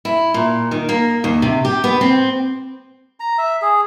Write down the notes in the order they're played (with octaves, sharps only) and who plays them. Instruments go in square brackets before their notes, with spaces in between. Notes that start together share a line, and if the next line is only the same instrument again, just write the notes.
[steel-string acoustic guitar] E4
A#2
D#3
A#3
D#2
C3
G4
B3
C4
[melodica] A#5
E5
G#4